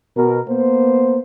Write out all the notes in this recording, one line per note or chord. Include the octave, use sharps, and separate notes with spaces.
B2 A#4
A#3 B3 C5